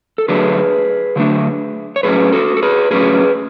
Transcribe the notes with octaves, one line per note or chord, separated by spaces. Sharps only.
A4
D3 F#3 A3 D4 G#4 B4
D3 F#3 A3 D4
C#5
A2 F#3 C#4 G#4 B4
F#4 A4
A4
G#4 B4
A2 F#3 C#4 G#4 B4